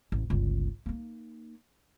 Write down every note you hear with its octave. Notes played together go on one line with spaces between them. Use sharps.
A1
G1 C#2
A#3 D#4